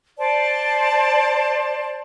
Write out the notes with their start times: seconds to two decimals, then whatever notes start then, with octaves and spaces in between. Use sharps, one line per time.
0.18 C5 D5 A5